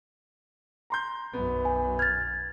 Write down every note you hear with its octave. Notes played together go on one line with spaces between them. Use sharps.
A#5 C6 G6
B1 F#2 B3
G#5
F6 G#6 A6